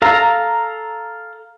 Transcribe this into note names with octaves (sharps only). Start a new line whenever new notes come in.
A4 F5 A#5